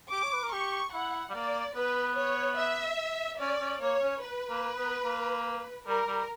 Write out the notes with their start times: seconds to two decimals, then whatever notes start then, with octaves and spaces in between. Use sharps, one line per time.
0.12 G4 D6
0.23 C#5
0.33 B4
0.43 A#4
0.52 G4 C#6
0.94 E4 F#5
1.29 G3
1.35 A#3 D5
1.76 B3 B4
2.17 C#5
2.58 E5
3.40 C#4 D5
3.61 C#4
3.81 A#3 C#5
4.01 C#4
4.22 B4
4.50 A#3
4.78 B3
5.05 A#3
5.87 G3 A#4
6.07 G3